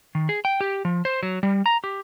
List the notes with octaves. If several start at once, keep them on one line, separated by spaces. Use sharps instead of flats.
D#3
G#4
G5
G4
F3
C5
F#3
G3
A#5
G4